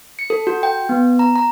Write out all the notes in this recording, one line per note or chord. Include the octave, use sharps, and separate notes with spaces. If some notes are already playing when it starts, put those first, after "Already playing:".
C#7
A4
F#4
G5
B3
A#5
A#5